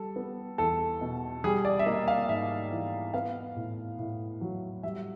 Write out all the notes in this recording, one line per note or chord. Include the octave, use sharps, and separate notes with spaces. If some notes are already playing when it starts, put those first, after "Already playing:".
Already playing: G3 A4
B3
E2 A4
B2
G3 G#4
D5
E5
A#3 D#5
F5
G#2 E5
E3
B3 F5
A2
A2
F#3
G3 E5